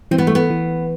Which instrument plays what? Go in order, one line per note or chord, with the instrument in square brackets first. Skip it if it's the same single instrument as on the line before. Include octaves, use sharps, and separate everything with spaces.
[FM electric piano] E3 [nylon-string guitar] C4
[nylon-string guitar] B3
A3
B3
[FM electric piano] E3